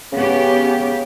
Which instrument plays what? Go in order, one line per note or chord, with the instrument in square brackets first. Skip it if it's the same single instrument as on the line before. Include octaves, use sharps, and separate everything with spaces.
[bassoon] C#3 [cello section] B3 G4 [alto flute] C#4